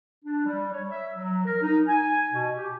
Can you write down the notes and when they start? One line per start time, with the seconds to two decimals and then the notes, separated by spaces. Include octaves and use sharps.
0.25 D4
0.45 G3
0.72 C#5
0.89 E5
1.15 F#3
1.46 A#4
1.62 D#4
1.88 G#5
2.32 B2
2.56 G4